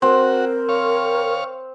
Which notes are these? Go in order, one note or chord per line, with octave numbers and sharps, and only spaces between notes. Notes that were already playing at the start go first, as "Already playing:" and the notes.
C4 F#4 A#4
C#5 F5